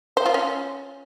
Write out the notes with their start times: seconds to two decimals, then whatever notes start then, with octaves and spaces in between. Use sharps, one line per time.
0.17 C5
0.26 F4
0.34 C#4